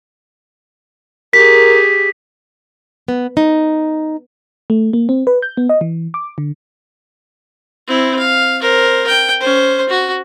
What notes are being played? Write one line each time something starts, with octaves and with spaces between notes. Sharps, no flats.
G4 G#4 A#4 B6
B3
D#4
A3
A#3
C4
B4
G6
B3
D#5
E3
D6
D3
C4 E4
F5
A#4 C5
G5
C#4 C5
F#4